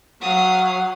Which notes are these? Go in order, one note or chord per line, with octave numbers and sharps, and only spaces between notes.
F#3 F5 F#5 D#6